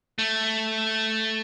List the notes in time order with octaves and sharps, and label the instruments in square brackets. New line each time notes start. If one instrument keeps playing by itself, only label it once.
[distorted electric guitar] A3